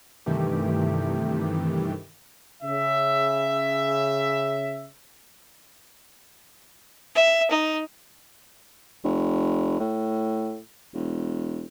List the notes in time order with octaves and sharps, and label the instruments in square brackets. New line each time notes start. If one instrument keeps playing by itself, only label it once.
[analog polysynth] G2 C3 D#3 E3 A3 G4
[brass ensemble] C#3 E5
[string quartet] E5
D#4
[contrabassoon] F1
A2
E1